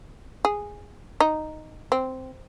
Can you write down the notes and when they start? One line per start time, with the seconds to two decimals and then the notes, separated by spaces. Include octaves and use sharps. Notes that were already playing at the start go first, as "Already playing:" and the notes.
0.45 G#4
1.20 D#4
1.92 C4